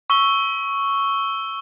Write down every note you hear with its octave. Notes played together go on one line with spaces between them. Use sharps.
C#6 E6 G7